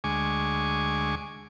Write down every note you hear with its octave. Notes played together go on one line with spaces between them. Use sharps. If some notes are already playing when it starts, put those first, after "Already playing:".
D2 G#3 G#5 C#6 D6